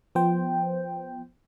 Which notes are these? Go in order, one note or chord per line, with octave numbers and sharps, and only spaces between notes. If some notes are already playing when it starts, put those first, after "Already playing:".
F3 B3 C5 G5